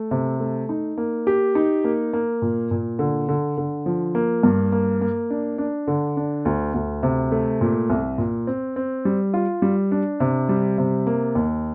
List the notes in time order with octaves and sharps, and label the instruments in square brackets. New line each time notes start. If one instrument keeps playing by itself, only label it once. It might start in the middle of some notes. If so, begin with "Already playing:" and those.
Already playing: [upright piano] A3
C3
A3
D#4
A#3
G4
D#4
A#3
A#3
A#2
A#2
D3
D3
D3
F3
A#3
G2
A#3
A#3
D4
D4
D3
D4
D2
D2
C3
A3
A#2
C2
A#2
C4
C4
G3
F4
G3
D4
C3
G3
C3
A#3
D#2